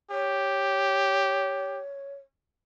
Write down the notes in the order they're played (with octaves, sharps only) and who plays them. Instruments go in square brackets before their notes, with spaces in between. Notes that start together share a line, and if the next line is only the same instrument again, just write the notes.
[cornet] G4 [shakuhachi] C#5